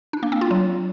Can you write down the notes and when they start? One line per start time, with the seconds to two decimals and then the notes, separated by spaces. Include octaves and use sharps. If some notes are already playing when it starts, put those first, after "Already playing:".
0.13 D4
0.23 A#3
0.32 C4
0.41 F4
0.51 F#3